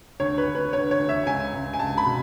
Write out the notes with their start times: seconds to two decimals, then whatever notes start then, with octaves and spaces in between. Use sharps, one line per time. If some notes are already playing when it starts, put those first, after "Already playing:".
0.20 D2 C#5
0.38 B4
0.46 D2
0.55 B4
0.73 D3 C#5
0.91 C#5
0.99 D2
1.09 E5
1.26 C#2 G#5
1.53 C#2
1.74 G#5
1.79 C#2 A5
1.98 B5
2.06 B2